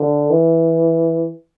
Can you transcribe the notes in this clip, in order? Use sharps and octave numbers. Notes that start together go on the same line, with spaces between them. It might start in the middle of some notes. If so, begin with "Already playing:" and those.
Already playing: D3
E3